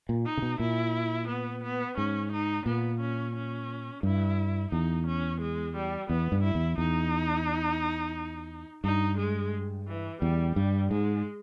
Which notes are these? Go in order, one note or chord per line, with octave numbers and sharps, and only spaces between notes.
A#2
D#4
C#3
B2
A#2 E4
B3
B3
G#2 C#4
D#4
A#2 B3
C#4
C#4
G2 E4
E2 D#4
C#4
G#3
G3
E2 B3
G2
E4
E2
E2 D#4
G2 D#4
G#3
E3
E2 G3
G2 G3
G#2 G#3